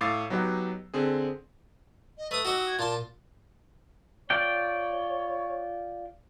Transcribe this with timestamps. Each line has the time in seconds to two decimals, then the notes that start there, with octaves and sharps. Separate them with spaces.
0.01 A2 F5 D6 E6 A6 C7
0.30 F#3 B3 D#4 G4 F#5
0.94 D3 C4 G#4
2.18 D#5
2.31 A3 B4 D#6 E6
2.45 D#4 F#4 G4
2.67 G#6
2.79 A#2 F4 A5 C6
4.30 F4 C#5 D5 G5